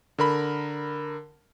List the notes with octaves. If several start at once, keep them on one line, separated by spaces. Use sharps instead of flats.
D3 A#4 B5